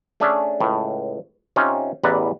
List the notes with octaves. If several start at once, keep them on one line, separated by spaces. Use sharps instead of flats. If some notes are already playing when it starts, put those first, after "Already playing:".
A3 C#4 D4 G#4 D5 E5
C#2 A2
C3 C#4 D#4 F4
A1 E2 B4 D5 F#5 A#5